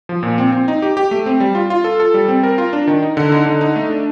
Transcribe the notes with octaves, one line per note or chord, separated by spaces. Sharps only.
F3
A#2
C4
C4
D#4
G4
G4
A3
C4
G3
F4
F4
A4
A4
G3
C4
A#4
F4
D4
D#3
D#4
D3
D#4
D3
D#4
A3
D4